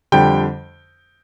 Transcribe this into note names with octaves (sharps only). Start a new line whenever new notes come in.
F2 D3 G3 G5